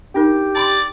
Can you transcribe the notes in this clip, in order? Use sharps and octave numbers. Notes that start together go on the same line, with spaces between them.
D4 D#4 G4 A#4
D5 A5 B5 C6